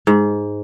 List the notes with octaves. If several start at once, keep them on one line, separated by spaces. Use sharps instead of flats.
G#2